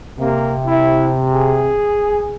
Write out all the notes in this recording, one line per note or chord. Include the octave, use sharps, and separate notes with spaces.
C3 A#3
E4
G#4